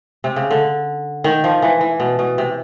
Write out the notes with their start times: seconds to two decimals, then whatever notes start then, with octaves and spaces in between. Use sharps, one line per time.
0.24 C3
0.36 C#3
0.51 D3
1.24 D#3
1.44 F3
1.62 E3
1.81 E3
2.00 B2
2.19 B2
2.38 C3